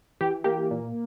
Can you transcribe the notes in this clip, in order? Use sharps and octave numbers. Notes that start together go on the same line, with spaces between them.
E3 G4
A#3 G4
A#2